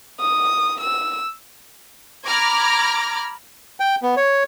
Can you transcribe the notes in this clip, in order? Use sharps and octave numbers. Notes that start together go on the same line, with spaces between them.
D#6
E6
A#5 B5 D6 F6 G#6 A#6
G5
B3
C#5